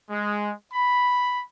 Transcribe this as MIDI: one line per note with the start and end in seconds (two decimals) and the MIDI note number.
0.10 0.53 56
0.74 1.43 83